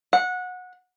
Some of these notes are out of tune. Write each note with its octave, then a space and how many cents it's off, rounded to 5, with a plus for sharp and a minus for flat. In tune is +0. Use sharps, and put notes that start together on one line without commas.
F#5 -20